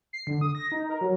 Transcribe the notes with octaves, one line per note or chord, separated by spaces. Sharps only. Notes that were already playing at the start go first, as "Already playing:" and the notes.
C7
D3
D#6
A#6
D#4
A#4
F#3